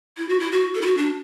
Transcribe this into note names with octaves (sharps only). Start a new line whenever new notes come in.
E4
F#4
E4
F#4
A4
E4
F#4
D4